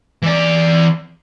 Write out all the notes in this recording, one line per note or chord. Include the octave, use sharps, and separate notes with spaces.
E3 D5